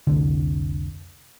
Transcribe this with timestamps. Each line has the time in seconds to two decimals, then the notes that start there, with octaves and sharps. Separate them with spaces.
0.07 F1 C2 D3